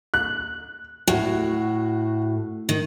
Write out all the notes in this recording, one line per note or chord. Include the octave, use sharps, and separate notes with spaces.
F#6
A2 F#4
D#3